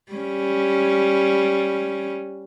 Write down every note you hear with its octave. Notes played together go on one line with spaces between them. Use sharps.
G3 C#4